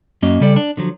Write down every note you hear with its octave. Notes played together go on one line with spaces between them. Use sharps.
F#2 F#3 A#3 C#4 D#5
C#3 G3 A4 D5
D4
D3 F3 F#3